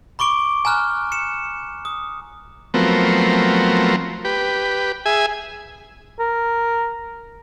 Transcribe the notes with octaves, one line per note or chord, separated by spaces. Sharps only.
B5 C#6 D6 D7 G7
G#5 A#5 F6 F#6
C#7 E7
D#6
F3 F#3 A3 B3 C4 A#4
G4 B4
G#4 E5 G#5
A#4